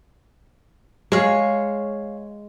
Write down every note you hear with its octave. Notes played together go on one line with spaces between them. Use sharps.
G#3 C#5 F5